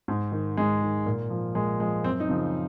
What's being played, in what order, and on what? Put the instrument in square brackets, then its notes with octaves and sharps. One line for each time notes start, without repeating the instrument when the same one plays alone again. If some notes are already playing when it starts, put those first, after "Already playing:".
[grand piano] G#2
D#3
G#2 G#3
D#3
A#2
F3
A#2 G#3
F3 G#3
F#2 C4
D#4
C#3 F3